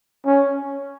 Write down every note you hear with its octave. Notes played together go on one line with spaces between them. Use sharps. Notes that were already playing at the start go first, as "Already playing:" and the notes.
C#4